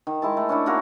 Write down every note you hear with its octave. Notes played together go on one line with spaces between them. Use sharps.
D#3
G#3 E4 A5
A3
C#4 D4 E4
A#3 D#4 F#4 A#4